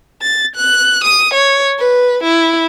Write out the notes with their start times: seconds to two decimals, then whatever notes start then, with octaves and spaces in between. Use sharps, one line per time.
0.22 A6
0.56 F#6
1.04 D#6
1.34 C#5
1.79 B4
2.24 E4